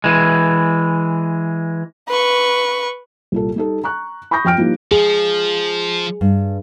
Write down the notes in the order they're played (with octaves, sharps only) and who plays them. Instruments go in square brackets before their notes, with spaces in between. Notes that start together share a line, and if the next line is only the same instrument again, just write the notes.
[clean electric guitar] E3 G#3
[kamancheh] B4 C#6
[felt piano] C2 A#2 A4
G3 D#4 A4
A#5 C#6 F#6
B5 C#6 D#6 G6 A#6
F2 G5 F6 D7
F3 G3 A#3 D#4 E4
[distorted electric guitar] F3 [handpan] G#4
[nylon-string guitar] G2